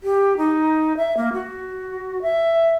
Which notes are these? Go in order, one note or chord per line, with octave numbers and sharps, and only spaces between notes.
G4
D#4
E5
A#3
F#4
E5